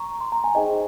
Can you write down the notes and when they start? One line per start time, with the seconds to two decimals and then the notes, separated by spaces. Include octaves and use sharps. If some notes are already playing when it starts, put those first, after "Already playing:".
Already playing: A#5 C#6
0.21 C6
0.32 A#5
0.44 G#5
0.55 D#4 G#4 C5 D#5 G5